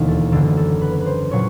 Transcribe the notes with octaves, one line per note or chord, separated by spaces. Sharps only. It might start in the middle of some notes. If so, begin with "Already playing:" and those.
Already playing: E1 D#2 D3
A4
F#1 F#2 D3 A4
A4
B4
B4
C5
A#2 F#3 C#5